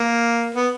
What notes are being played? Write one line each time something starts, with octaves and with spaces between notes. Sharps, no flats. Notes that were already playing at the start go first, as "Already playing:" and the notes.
Already playing: A#3
B3